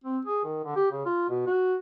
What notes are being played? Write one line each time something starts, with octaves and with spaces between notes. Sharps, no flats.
C4
G#4
D#3
D3
G4
C#3
F4
B2
F#4